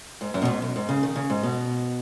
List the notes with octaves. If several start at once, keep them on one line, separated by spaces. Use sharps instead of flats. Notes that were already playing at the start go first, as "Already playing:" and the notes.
G#2
F#2
B2
G#2
F#2
G#2
C#3
D#3
C#3
G#2
B2